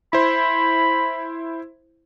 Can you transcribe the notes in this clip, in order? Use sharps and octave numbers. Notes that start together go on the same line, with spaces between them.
E4 C5 B5